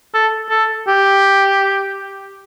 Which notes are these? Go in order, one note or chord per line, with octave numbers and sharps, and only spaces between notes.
A4
A4
G4